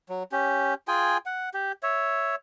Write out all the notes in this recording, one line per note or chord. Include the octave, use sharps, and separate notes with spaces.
F#3
C#4 G4
F4 G#4 G5 G#5
F#5
G4
C#5 E5